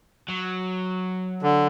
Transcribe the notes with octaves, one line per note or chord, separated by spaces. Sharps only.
F#3
D3